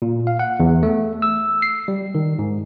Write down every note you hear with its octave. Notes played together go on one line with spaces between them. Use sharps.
A#2
F5
F#5
E2
A3
E6
C7
G3
D#3
G#2